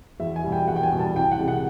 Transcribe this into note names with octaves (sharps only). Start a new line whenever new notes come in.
E2 E5
G#5
B2 G3
G5
E2 F#5
G5
G#5
B2 G3
A5
C2 G5
F#5
C3 E3 G#3
F#5